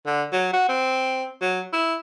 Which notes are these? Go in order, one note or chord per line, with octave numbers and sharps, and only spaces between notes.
D3
F#3
F#4
C4
F#3
E4